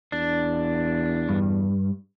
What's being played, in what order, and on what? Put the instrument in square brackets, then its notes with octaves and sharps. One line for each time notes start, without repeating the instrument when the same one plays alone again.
[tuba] E2 [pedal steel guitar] D4
[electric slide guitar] G2